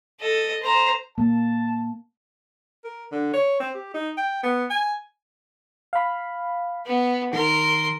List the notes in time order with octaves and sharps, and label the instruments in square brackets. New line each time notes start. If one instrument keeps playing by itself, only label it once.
[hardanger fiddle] A4 D#5
C5 A#5
[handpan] A#3 [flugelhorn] A5
[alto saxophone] A#4
D3
C#5
C4
G4
D#4
G5
B3
G#5
[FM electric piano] F5 B5
[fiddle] B3
[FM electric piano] D#3 [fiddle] A#4 C6